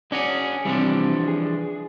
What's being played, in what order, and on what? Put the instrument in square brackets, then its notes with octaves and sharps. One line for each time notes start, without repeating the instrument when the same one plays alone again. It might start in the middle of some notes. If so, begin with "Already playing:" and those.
[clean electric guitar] C#4 F#4 G#4 [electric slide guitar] D4 D5
[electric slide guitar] C3 G3 [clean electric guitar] E3 F3 D4
[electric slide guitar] G#4